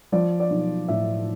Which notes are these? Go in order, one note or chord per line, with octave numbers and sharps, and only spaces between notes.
F3 D5
D5
B1
A2 E5